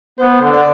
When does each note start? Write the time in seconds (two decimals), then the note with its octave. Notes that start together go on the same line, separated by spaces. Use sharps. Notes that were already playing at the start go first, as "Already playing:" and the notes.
0.19 B3 C5
0.41 D3
0.53 D5